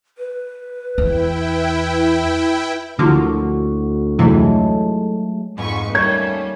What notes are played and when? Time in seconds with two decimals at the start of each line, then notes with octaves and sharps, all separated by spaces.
0.18 B4
0.98 E2 E4 G5
2.99 D2 D3 F3 A#3 E4 F#4 D6 E6
4.19 F2 C3 E3 F#3 G#3 A3 E4 F4
5.58 F2 G#2 B4 C#6
5.95 D#2 G3 A3 C#4 A#4 C#5 G#6